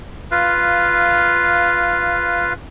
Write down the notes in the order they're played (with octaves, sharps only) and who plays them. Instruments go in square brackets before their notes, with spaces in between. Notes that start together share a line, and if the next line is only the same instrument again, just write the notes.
[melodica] F4 B4 F5